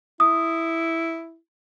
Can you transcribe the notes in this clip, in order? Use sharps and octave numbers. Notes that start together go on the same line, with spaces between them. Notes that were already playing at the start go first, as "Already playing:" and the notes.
E4 D#6